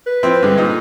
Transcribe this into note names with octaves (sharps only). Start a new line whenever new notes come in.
B4
F3 C4 E4
G2 D3 G#3
A#2 D#4